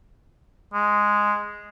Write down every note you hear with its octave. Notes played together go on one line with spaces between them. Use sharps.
G#3